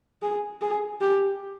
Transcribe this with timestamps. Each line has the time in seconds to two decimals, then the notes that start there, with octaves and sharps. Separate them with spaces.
0.22 G#4
0.61 G#4
1.01 G4